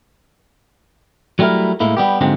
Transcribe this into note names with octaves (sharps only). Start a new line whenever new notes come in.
F#3 G3 A3 E4 A#4
A2 G#3 A#3 E4
G3 B3 G4
G#2 D3 F#3 G#3 A#3 C4